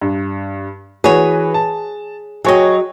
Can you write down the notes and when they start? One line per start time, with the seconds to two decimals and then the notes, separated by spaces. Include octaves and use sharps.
0.01 G2
1.04 E3 F#4 G#4 B4 C#5
1.54 A5
2.45 F#3 G#4 C#5 D#5 G5